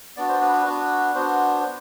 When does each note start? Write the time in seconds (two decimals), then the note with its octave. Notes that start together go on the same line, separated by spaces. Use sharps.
0.17 B3 D4 F#4 D5
0.28 C5
0.41 B4
0.53 B4
0.65 B3 D4 F#4 B4
1.15 B3 D4 F#4 C5